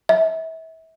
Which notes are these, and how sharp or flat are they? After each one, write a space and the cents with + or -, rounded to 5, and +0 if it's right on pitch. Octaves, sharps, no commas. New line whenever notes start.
E5 -30